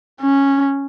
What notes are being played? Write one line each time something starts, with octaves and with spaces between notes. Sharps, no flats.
C#4